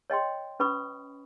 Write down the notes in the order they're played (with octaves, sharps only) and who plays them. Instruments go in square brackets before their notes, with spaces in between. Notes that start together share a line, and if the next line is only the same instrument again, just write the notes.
[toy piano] C#5 D#5 G5 C6
C#4 B4 B5 C#6 D#6